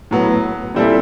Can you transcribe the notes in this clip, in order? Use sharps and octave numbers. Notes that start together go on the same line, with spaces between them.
A2 F#3 B3
A#2 G3 C4 E4 A4